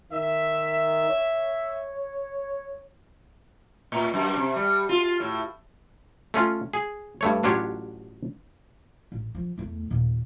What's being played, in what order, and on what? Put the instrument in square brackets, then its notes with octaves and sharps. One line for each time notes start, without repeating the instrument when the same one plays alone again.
[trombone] D#3 [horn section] E5
[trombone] C#5
[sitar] A2
F#2
C3
G3
F4
A2
[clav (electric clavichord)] A3 C#4 F4
G#4
G2 A3 C#5
A1 F#3 D4 F4 G4 C#5
[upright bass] A1
F3
E2 A3
D#2 A#2